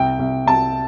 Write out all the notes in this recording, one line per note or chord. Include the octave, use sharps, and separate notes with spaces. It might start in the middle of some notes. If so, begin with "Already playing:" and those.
Already playing: C2 G5
C2
C2 A5